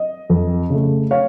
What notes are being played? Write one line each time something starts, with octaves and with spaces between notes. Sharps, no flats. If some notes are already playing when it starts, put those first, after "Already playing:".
Already playing: D#5
F2
C#3 A3
C#5 F5